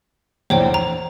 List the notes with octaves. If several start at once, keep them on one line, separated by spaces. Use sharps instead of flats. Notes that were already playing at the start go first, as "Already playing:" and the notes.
F1 A#1 E2 C5 C#5 G5
A#5 F7